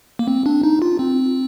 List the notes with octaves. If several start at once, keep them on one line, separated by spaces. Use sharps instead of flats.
A#3
C4
D4
D#4
F4
C4